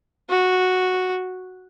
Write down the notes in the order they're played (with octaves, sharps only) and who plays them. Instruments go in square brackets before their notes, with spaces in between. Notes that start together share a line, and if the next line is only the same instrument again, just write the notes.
[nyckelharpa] F#4